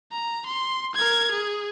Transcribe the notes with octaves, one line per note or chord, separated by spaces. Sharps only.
A#5
C6
A#4 G#6
G#4